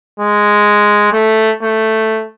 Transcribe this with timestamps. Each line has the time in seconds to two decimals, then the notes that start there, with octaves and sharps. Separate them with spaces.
0.20 G#3
1.13 A3
1.63 A3